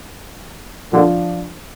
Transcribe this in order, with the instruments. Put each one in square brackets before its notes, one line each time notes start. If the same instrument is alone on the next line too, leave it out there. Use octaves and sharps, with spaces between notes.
[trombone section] A#2 D3 [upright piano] F3 D4 F4